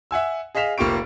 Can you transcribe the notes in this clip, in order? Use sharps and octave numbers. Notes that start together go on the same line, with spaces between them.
E5 F#5 G#5 E6
G#4 D#5 F5 B6 E7 F7
F1 A#3 F4 G4 C#6 D7